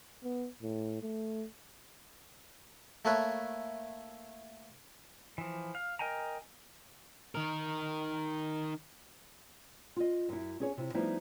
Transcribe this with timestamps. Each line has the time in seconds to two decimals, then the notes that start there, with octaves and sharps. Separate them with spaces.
0.23 B3
0.62 A2
1.02 A3
3.05 A3 A#3 A4 B4 C#5
5.38 E3 F3
5.75 F5
5.99 A#4 D#5 G5 G#5 A#5
7.35 D#3 A#4
9.96 F4 D#5
10.29 F#2 E4
10.60 C#4 G#4 C#5
10.77 C3 E4
10.94 F3 G3 A3 B3 D#4 E4